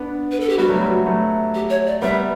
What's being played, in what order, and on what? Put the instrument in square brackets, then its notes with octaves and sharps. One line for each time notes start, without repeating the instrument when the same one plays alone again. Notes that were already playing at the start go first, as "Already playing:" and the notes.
Already playing: [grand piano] B3 D4
[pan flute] B4
A4
G4
[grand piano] G3 B3 [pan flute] F#4
[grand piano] F#3 A3
G3
G3
F#3 A3
[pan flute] G4
C#5
D5
[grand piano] G3 B3 [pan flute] E5